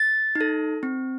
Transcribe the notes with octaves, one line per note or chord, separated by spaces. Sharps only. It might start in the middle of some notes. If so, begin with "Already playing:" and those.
Already playing: A6
D#4
A4
C4